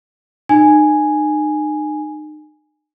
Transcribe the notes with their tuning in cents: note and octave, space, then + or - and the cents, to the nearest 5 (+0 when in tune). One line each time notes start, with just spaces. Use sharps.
D#4 -40 G#5 +0